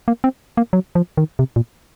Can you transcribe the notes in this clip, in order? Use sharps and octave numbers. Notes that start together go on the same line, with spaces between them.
A#3
C4
A#3
F#3
F3
D#3
C3
A#2